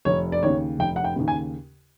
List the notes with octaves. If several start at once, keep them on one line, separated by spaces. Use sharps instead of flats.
F1 C#5
D5
D#2 C#3 C#5
F1 G5
F#5
G5
D#2 C#3
G#5